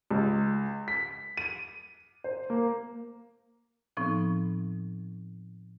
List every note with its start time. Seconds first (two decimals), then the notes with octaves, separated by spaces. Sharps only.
0.11 C#2
0.88 B6
1.37 D#7
2.24 C5
2.50 A#3
3.97 A2 F3 B3 C4 D#4